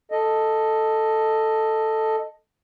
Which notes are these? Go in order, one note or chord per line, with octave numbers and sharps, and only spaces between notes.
A4 D#5